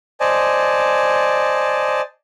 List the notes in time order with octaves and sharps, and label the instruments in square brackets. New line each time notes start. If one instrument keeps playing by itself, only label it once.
[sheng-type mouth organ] C5 D5 D#5 G#5 A5